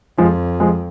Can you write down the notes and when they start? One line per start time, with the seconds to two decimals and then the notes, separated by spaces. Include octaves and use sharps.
0.18 F2 F3 G#3
0.60 F3 G#3